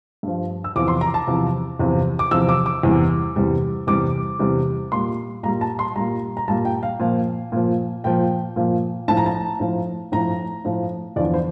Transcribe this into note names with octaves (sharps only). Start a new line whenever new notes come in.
G2 F3
E6
E2 C3 F3 D6
C6
A#5
A5
E2 C3 F3
E2 C3 F3
D6
E2 C3 F3 E6
D6
D6
E2 C3 G3
E2 C3 G3
E2 C3 G3 D6
E2 C3 G3
A#2 G3 C6
A#2 G3 A#5
A5
C6
A#2 G3 A#5
A#5
A#2 G3 A5
G5
F5
A#2 F3
A#2 F3
A#2 F3 G5
A#2 F3
A2 F3 A5
A#5
A5
A2 F3
A2 F3 A#5
A2 F3
E2 D3 F3 D5
C5